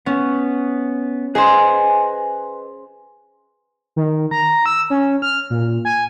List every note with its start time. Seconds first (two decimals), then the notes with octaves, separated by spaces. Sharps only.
0.06 B3 C#4
1.35 G#4 B4 C5 D#5 G#5
3.96 D#3
4.31 A#5
4.66 E6
4.90 C#4
5.22 F6
5.50 A#2
5.85 G#5